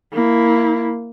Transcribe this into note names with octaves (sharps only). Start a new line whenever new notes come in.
A#3 E4